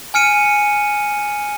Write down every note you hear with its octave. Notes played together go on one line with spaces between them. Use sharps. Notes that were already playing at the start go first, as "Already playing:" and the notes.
G#5 F6 C#7 D#7